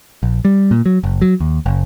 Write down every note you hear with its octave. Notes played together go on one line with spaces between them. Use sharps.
A#1
G3
A#2
F#3
F#1
F#3
D#2
F#1